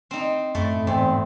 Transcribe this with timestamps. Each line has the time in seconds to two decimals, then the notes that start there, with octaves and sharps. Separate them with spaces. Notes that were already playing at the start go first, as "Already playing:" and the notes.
0.11 C4 D#4
0.55 F#2 A2 A3
0.87 E2 G#2 C4